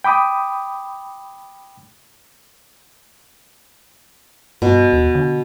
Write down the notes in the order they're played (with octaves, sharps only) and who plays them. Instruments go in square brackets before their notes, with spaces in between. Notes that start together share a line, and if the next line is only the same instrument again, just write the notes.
[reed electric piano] G5 B5 D6 D#6
[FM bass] G2 [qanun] B2
[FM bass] D#2
D3